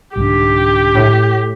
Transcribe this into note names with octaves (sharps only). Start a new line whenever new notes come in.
C2 G#2 D3 G4
A2